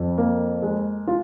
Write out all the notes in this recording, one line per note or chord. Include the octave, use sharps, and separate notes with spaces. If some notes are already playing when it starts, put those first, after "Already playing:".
Already playing: F2
A#3
G#3
F4